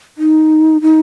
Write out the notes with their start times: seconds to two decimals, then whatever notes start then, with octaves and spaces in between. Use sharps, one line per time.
0.18 D#4
0.82 D#4